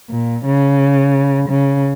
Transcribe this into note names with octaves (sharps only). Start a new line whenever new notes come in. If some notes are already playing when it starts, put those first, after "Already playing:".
A#2
C#3
C#3